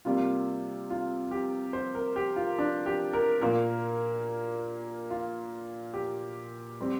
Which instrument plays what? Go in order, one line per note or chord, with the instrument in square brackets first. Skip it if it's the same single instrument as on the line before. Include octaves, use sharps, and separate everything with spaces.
[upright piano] C3 G3 A#3 F4
F4
G4
C5
A#4
G4
F4
D4
G4
A#4
A#2 A#3 A#4
F4
G4
G3 C4